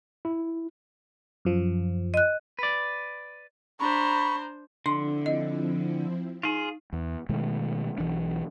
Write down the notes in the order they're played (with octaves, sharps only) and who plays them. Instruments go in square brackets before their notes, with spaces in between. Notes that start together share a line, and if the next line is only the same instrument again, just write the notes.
[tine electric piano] E4
[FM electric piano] F#2 F3
[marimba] D#5 F#6
[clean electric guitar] B4 D5
[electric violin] D4 C5 [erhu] A#5 [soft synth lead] B5 [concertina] C#6
[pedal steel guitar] D3 [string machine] F3 C4 E4 [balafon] D4 C6
[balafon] D#5
[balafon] D#4 [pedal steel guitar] F4 G#4
[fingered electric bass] E2
B2 D#3 G#3 A3
B1 E3 D4